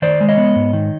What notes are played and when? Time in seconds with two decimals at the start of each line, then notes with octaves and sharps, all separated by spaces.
0.02 D#3 C5 D5
0.21 G#3
0.29 C#5 D#5
0.38 B3
0.56 G#2
0.73 D#3